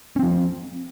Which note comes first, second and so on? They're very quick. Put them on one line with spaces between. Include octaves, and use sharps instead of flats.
C#4 C4 F3